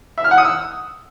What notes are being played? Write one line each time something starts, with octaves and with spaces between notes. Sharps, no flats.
E5
F6
F#5
D#6
E6